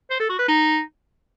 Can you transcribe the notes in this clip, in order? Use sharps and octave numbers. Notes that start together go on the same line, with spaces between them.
C5
A4
F#4
B4
D#4